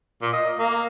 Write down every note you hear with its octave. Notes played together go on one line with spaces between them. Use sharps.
A#2
D#5
A#3